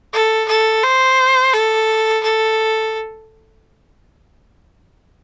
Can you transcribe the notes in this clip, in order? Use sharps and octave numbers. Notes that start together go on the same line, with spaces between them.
A4
A4
C5
A4
A4